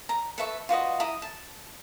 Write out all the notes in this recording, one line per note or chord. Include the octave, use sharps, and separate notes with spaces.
A#5
A4 B4 E5 C#6
F4 F#4 B4 D#5
E4 A#5 D#6
A5